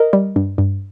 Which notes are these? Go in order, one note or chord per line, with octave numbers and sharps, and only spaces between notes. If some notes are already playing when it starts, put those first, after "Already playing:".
Already playing: A#4 D#5
G3
G2
G2